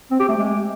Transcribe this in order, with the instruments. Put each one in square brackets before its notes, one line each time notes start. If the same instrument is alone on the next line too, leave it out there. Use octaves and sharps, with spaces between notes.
[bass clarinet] C4
G4
A3
G#3